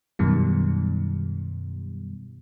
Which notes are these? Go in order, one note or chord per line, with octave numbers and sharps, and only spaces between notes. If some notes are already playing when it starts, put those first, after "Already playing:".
F#2 B2 D#3 G3